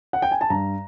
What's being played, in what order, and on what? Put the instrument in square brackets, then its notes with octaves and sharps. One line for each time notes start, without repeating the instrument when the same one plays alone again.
[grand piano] F#5
G5
G#5
A5
G2 A#5